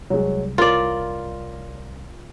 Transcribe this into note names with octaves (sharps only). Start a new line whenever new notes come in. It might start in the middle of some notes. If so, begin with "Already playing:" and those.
C2 F#3 G#3
F4 A#4 C#5 D5